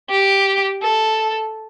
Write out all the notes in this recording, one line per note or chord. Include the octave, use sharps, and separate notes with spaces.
G4
A4